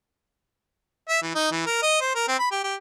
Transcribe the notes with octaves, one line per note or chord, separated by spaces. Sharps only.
E5
E3
D#4
E3
A#4
D#5
C5
A#4
C4
B5
G4
G4